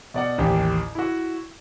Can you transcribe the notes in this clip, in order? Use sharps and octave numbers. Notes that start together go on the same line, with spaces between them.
B2 D5 F#5
A1 D#2 G4
E4 F#4